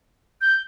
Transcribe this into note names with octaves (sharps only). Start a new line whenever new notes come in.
G6